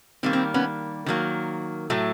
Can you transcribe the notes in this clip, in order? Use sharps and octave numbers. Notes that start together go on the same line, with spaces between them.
D#3 G3 A#3 C4
C4
B3 C#4
D#3 F#3 A#3
A2 F#3 A3